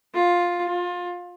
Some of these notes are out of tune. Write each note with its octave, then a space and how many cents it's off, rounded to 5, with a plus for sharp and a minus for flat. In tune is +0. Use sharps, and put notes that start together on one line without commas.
F4 +10
F4 +25